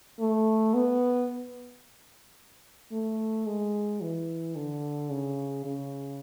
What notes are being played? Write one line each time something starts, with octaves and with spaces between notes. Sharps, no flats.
A3
B3
A3
G#3
E3
D3
C#3
C#3